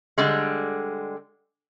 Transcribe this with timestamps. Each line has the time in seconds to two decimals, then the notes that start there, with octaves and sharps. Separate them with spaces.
0.18 D3 G3 G#3